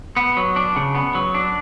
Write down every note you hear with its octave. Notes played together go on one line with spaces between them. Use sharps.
B3
F#3
D4
C#3
B3
F#3
D4